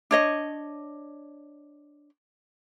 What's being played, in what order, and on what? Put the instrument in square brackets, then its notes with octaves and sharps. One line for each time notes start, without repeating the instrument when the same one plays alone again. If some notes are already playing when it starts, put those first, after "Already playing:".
[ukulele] D4 C#5 D#5